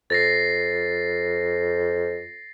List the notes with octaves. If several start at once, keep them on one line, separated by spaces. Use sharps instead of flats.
F2 A6 A#6 C7